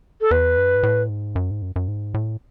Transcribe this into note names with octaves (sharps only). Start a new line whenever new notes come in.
A4
E2 B4
F#2
G#2
A2
G#2
F#2
G#2
F#2
F#2
G#2
A2